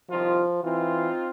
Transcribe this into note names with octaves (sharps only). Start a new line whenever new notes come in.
C2 D#3 F3 F4
E3 C4 D#4 F4